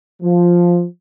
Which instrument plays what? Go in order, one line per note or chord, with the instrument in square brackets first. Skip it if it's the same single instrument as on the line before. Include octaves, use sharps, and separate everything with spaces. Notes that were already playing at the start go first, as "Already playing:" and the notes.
[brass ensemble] F3